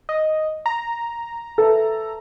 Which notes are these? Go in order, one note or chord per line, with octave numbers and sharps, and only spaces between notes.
D#5
A#5
A4 B4 E5